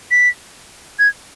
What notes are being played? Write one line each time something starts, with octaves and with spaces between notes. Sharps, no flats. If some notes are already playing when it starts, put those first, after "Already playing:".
B6
G#6